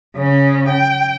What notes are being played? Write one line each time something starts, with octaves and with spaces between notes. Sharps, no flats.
C#3 C#4
G5